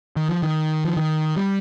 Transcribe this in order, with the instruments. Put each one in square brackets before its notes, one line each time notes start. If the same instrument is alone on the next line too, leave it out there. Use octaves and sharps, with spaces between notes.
[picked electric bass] D#3
F3
D#3
F3
D#3
G3